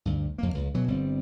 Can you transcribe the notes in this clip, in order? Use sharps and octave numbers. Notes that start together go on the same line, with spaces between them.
D2 G2
F2 A#3
C#2
B2 E3 F#3
G1 G3 C4